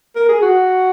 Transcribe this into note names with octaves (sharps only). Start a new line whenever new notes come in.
A#4
G#4
F#4